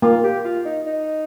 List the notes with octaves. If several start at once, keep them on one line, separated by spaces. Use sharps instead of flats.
A#3 F4
G4
F4
D#4
D#4